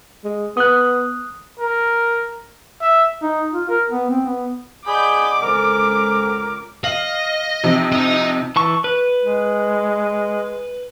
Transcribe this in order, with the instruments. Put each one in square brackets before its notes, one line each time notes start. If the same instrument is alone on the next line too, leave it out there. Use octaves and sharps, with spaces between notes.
[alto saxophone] G#3
[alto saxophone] B3 [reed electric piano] D#6 F#6
[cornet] A#4
[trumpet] E5
[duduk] D#4
F4
A#4
B3
C4
B3
[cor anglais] G#4 [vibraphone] D5 D#5 F#5 [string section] B5 G6 [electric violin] D6
[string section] C#2 [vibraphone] A4 C5 G#5 [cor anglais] A#4
[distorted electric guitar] D#5 [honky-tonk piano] F5 F#7
[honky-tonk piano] C3 F3 D#4
[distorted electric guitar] D#5 A#5
[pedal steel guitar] E3 A5 C#6
B4
[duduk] G#3